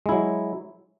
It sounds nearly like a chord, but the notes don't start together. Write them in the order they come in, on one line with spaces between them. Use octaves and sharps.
G#3 E4 F#3